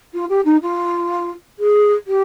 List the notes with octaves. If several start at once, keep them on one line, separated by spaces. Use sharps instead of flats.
F4
G4
D#4
F4
G#4
G4